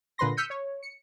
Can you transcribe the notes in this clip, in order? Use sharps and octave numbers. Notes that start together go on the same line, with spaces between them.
A#2 D3 B4 B5 C6 A#6
E6 F6 G6 B6 C#7 D#7
C#5
C#7